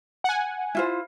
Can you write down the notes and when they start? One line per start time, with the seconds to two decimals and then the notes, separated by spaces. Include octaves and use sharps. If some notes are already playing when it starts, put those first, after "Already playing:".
0.24 F#5 G#5
0.75 E4 F4 C5